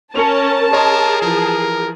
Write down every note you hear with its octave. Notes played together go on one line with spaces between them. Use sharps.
C#4 A#4 C#5 A5 C#7 F7
G#4 A#4 C#5 D#5 C6
E3 F3 A#4